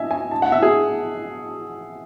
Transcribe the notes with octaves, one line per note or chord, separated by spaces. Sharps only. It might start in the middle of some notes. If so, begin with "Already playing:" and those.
Already playing: D#5 E5 G#5
G#5
A5
F#5
E5
G#4